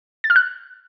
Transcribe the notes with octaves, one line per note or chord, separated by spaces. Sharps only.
A6
F6
F#6